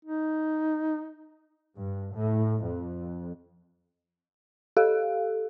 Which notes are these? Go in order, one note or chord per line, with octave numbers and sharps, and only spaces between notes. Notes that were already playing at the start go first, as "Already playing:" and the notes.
D#4
G2
A2
F2
G4 A4 F5